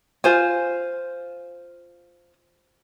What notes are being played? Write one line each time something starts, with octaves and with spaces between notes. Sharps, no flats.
F4 C5 G#5